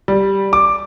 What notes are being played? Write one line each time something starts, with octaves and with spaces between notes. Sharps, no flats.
G3
D6